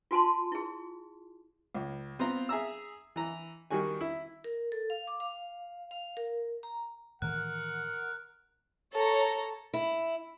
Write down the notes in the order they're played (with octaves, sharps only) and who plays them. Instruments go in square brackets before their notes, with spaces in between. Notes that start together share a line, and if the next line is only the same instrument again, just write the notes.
[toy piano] F4 F#4 G#5 A5 C6
E4 G#4
[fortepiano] C#2
B3 C4 F4 A#5
G#4 E5 A#5 E6
E3 A#5
D#3 G3 F#4 G#5
E4
[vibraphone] A#4
A4
F5
D6
F5
F5
A#4
A#5
[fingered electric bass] A2 D#3 E3 [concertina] A#4 [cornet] F#5 [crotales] F#6
[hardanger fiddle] A4 [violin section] C#5 A#5
[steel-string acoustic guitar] E4